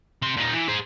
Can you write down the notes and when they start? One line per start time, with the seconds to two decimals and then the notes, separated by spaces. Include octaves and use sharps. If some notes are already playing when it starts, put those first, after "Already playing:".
0.22 C3 C6
0.37 A#2 D#4
0.53 E3
0.68 G#4 C5